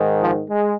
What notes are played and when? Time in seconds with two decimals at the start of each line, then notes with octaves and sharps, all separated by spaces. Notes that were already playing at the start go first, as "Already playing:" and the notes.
Already playing: G#2 D#3
0.22 F3
0.49 G#3